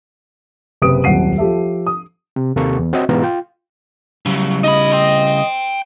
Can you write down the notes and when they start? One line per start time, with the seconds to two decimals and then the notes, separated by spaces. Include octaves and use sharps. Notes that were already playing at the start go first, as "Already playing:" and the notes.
0.82 F#1 C3 B4 D#6 D7
1.04 D#1 C2 F#2 F#5 C7 D#7
1.38 F3 G4 A4 E5
1.87 D#6
2.36 C3
2.56 D#2 C3 A#3 A4 C#6
2.79 E2
2.93 C4 F#4 C#5 D#5 E5
3.09 G#2 B2 E3 B3 F5 A#5
3.23 F4 G5
4.26 C#3 F#3 G3
4.64 D#4 D#5 B5
4.93 G5 C6